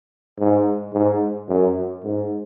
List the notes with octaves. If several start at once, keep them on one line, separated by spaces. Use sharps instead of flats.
G#2
G#2
F#2
G#2